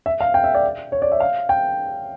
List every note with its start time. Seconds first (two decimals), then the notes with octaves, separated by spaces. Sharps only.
0.06 E5
0.21 F5
0.34 G5
0.44 E5
0.55 D5
0.92 C#5
1.02 D5
1.12 E5
1.20 F5
1.49 G5